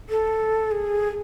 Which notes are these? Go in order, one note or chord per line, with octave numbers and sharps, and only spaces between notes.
A4
G#4